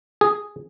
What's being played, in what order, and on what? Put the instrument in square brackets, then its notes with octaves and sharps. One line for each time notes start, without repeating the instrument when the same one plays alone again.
[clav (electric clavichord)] G#4